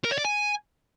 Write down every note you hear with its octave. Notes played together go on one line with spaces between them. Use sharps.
A#4
C#5
D5
G#5